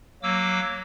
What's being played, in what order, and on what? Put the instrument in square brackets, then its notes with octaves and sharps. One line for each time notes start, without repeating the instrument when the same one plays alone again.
[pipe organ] F#3 A#3 D6 E6